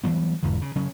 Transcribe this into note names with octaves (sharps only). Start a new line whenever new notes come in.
E3 F#3 G3 B3
F#1 E2 G#2 D3
C#3
C#3 F#3 C#4